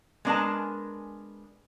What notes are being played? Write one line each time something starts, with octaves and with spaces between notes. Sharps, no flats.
G#3 B3 D4 A#4 G#5 A5